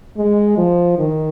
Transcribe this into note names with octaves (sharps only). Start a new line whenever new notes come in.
G#3
F3
D#3